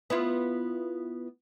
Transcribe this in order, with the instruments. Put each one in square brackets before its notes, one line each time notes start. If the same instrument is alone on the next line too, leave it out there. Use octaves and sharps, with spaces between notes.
[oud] B3 E4 F4